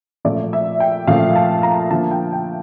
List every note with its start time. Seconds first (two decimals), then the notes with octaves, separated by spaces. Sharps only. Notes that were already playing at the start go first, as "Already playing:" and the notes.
0.25 A#2 F3 A3 D5
0.53 E5
0.80 G5
1.07 A#2 F3 A3 F5
1.36 A5
1.63 A#5
1.90 D3 F3 A#3 A5
2.11 G5
2.33 G5